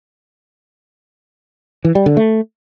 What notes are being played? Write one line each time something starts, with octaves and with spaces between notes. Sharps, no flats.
E3
G3
D3
A3